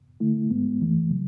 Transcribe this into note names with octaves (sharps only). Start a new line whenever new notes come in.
D3 A3 E4
G#2 G#3 B3
F#2 E3 A3
C#3 F#3